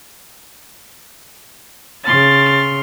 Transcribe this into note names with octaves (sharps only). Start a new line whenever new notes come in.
C#3 C6 F6 A6